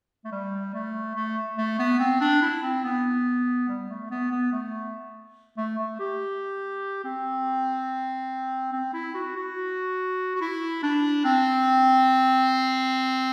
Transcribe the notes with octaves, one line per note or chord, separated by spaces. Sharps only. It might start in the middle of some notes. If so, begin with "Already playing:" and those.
A3
G3
A3
A3
A3
B3
C4
D4
E4
C4
B3
G3
A3
B3
B3
A3
A3
A3
G4
C4
C4
E4
F#4
F#4
F#4
E4
D4
C4